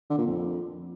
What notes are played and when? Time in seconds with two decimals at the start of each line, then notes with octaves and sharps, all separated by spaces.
0.10 D3
0.18 A#2
0.27 F2